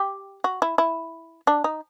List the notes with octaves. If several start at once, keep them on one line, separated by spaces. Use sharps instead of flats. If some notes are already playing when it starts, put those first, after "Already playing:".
Already playing: G4
F#4
E4
E4
D4
D#4